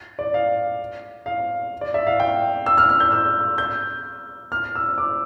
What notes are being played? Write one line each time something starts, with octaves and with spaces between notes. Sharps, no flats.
D5
F5
F5
D5
E5
F5
G5
E6
F6
F6
G6
E6
G6
F6
E6
D6